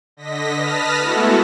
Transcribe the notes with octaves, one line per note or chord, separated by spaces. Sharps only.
D3 D#5 A#6 B6
B4 A5 D#6 F6 A#6 B6
G#3 A3 B3 E4 F#4 A4